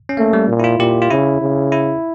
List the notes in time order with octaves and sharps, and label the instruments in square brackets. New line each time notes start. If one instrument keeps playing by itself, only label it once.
[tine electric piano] C#4
[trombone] A3 [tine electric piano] A#3
[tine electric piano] G3
[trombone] A#2
[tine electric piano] E4
F4
[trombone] A#2 [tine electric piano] G4
[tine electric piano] F4
[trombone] C#3 [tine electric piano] E4
[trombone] C#3
[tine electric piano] E4